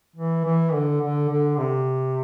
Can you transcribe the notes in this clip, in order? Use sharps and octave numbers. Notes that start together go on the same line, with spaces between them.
E3
E3
D3
D3
D3
C3